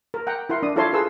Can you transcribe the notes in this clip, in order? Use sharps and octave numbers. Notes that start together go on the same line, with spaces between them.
A#4
F#5 G5 A#5
E4 A#4 F#5 C6
D4 D#6
E4 F4 A4 C#5 A5 C6
F4 G#4 A4 B4 C6 E6